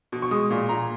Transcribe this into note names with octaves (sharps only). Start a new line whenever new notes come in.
B2
C#6
G#3 D#6
A#2
A#2 A#5